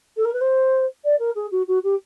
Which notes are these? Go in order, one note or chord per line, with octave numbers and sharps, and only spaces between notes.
A4
A#4
B4
C5
D5
A#4
G#4
F#4
F#4
G4